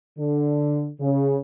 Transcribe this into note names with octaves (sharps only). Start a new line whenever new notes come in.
D3
C#3